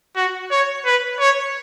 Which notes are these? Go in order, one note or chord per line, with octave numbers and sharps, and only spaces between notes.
F#4
C#5
B4
C#5